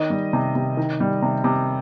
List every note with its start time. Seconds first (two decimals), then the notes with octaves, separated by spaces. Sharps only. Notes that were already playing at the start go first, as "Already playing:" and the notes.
Already playing: D#3 D#5
0.10 G3
0.33 C3
0.55 C3
0.77 D#3
1.00 G3
1.22 C3
1.44 C3